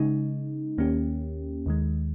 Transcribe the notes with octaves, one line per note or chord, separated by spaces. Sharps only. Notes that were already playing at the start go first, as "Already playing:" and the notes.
Already playing: C#3 G#3 D#4
D#2 D#3 A#3 C#4 G4
D#2 D#3 G#3